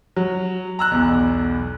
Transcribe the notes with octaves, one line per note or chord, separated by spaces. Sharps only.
F#3
A#5 E6 F#6
B1 E2